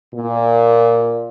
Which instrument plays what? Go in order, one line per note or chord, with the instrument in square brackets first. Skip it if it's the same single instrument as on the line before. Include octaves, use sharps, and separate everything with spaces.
[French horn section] A#2